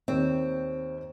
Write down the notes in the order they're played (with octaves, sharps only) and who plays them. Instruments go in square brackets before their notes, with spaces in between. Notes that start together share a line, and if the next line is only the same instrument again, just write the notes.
[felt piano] D#2 D#3 C#5 [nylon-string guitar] C4